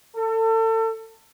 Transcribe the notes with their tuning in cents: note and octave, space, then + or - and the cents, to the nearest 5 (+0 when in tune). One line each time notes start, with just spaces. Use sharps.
A4 +30